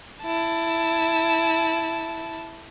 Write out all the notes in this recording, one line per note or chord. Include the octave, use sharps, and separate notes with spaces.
E4 A5